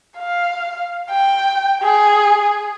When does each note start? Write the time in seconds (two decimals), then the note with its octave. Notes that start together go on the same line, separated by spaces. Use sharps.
0.18 F5
1.10 G5
1.83 G#4